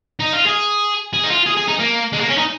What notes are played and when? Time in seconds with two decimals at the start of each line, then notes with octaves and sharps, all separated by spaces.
0.20 D#4
0.33 F4
0.47 G#4
1.13 G#4
1.24 D#4
1.30 F4
1.46 G#4
1.57 G#4
1.68 D#4
1.79 A#3
2.12 G#3
2.20 A#3
2.29 C#4
2.37 D#4